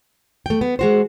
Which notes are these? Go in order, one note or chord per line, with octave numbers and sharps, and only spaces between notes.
A3 G5
B3
G#3 F#4 C5